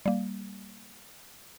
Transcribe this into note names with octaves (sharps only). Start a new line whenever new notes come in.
G3 A#3